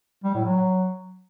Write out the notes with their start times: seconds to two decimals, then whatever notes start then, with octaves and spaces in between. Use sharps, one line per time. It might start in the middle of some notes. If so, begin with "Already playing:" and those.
0.24 G3
0.34 A2
0.45 F#3